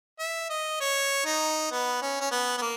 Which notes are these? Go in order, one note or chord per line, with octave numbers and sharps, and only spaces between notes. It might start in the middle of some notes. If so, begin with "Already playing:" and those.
E5
D#5
C#5
D#4
B3
C#4
C#4
B3
B3
A#3